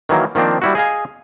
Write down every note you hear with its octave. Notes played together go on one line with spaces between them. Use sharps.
D#3 E3 F#3 A#3
D#3 F3 A#3 C4 D4
G3 E4 F#4
G#4 D#5 F5 G#5